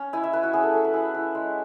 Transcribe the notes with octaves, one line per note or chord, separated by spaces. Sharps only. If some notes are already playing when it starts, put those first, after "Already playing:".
Already playing: C#4
E4 G#5
E5
E4 B4
F#4
C#4 G#4
A4
F#3 A4
B4
E4 G#4
E4
G#3